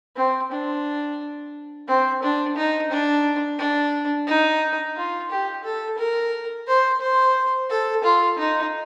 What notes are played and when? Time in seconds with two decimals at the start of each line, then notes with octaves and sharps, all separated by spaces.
0.16 C4
0.51 D4
1.88 C4
2.23 D4
2.56 D#4
2.90 D4
3.59 D4
4.27 D#4
4.96 F4
5.30 G4
5.64 A4
5.98 A#4
6.67 C5
7.01 C5
7.70 A4
8.04 F4
8.38 D#4